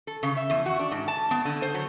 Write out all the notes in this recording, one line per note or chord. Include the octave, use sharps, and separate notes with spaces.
A4
C#3
E5
E2
F#4
D4
G#2
A5
B3
D3
C5
F#3